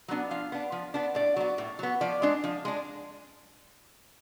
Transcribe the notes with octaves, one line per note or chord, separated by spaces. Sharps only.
F#3 B3 D4
F3 F5
B3 D4
F3
B3 D4
A2 D5
F#3 B3
A2
F#3 B3
F3 D5
G#3 D4
F3
G#3 D4